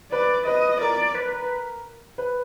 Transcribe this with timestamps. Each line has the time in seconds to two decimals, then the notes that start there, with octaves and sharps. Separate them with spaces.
0.11 B4 D5
0.46 B4 D#5
0.81 A#4 D5
1.15 B4
2.18 B4